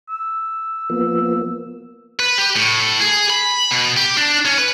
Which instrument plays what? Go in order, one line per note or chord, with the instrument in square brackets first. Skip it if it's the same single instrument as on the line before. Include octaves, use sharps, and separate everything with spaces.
[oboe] E6
[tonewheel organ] F3 A#3 B3
[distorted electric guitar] B4
G4
A2
G#4
B5
B2
G4
D4
C#4
B4